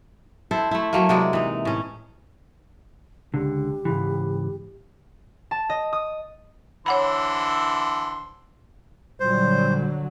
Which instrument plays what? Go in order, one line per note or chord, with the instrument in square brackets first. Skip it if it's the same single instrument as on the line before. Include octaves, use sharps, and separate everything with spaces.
[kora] E4 A4 C5
A3 E4
F#3 A3 A#3
C3 F#3 G#3 D5
E3 D#4
A2 C#4
[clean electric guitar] C#2 D3 [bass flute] G4
[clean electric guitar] G#2 C#3 E3
[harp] A5
D#5
D#6
[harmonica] D3 E3 C5 [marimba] C#5 F#5 B5
[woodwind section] A#2 G3 [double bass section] D3 F#3 [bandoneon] C5